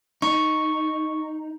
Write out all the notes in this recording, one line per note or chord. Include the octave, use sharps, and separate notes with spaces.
D#4 C#6